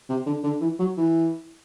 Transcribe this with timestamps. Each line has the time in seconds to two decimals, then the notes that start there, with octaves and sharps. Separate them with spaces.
0.09 C3
0.26 D3
0.43 D3
0.61 E3
0.79 F#3
0.97 E3